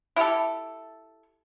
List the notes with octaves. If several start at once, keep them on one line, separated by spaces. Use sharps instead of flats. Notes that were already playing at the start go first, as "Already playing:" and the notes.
E4 G4 A4